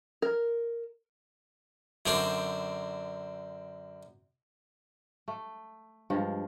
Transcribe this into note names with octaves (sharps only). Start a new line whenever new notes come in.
A#4
F#2 D3 C4 D4 C5
A3
G2 F3 G#3